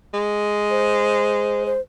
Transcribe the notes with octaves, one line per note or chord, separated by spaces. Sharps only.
G#3
C5
C5